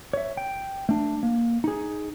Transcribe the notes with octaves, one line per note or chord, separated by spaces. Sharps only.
C#5 E5
G5
A3 D4
A#3
D#4 G#4